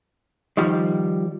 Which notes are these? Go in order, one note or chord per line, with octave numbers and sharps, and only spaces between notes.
D#3 F3 G3